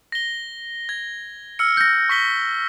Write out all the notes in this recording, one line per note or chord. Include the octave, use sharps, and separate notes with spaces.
A#6 G7
G#6
E6 F6 C#7
G6 A#6
C#6 B6 G7